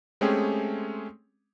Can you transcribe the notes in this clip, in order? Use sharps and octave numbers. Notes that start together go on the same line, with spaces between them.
G#3 A3 C4 C#4 G4 G#4